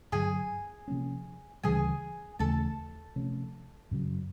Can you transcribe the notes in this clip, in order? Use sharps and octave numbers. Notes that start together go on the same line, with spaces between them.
G2 D3 F#3 G#4 G#5
C3 F3 A#3 C#4
D2 C#3 E3 G3 G#4 G#5
D#2 C#3 E3 A3 A4 A5
C3 F3 A3 C#4
F#2 C#3 F#3